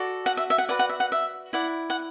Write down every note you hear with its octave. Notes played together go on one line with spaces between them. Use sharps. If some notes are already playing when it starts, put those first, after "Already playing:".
Already playing: F#4 A4 D5
F#5
E5
E5
F#5
F#4 B4 D5 F#5
F#5
E5
F#5
E5
E4 D5 F#5
F#5